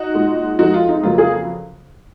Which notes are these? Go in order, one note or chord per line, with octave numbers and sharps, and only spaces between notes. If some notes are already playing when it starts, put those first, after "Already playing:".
Already playing: D#4 F#4
A#2 G#3
F2 F3 G#3 D#4 F#4
F4
D#4
F2 C#3 F#3 A#3 F4
F4 G#4